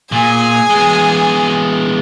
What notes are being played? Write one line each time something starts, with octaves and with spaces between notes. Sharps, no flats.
A#2 G#4 G#5
G#3 B3